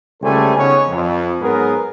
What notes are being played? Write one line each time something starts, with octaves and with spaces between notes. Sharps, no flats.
C#2 G3 A3 A4 C5 G#5
C#3 B3 C#4 D#4 B4 C#5
F2
G#2 F#3 B3 G#4 A#4